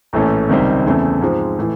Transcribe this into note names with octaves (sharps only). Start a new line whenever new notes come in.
A#1 A2 E3 A3 C#4
C#2 C3 D#3 G3 C4
E2 C#3 E3 A3 C4
G#2 F3 G#3 C4
A2 E3